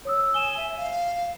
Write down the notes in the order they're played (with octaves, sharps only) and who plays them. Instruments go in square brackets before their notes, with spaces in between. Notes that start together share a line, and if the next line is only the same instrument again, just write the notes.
[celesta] C#5 D#6 E6
[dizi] G#5 [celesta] E7 G7
[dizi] E5
F5